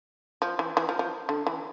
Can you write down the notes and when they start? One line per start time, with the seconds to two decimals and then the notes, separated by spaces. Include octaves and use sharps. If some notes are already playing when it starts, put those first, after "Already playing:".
0.42 F3
0.59 E3
0.77 E3
0.89 F3
0.99 F3
1.29 D3
1.47 E3